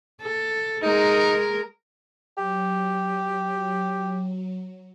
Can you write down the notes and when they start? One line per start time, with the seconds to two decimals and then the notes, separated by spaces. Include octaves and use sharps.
0.21 A4
0.82 G#3 D#4 A#4
2.37 F#3 G4